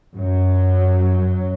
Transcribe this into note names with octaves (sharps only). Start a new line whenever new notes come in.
F#2 F#3